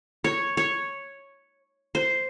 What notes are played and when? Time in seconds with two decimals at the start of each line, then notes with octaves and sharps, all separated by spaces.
0.24 C#5
0.57 C#5
1.95 C5